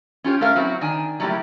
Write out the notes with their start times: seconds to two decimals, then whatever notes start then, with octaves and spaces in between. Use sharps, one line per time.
0.24 C#4 F4 G4 C#5
0.41 A3 C#4 A#4 F5
0.55 F#3 C4 C#4 E4 F#4
0.81 D#3 D4 G#5
1.20 F#3 G3 A3 A#3 E4 G4